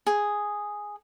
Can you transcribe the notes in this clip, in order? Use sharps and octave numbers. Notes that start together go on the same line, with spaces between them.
G#4